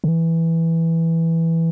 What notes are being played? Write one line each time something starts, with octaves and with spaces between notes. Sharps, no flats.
D3
E3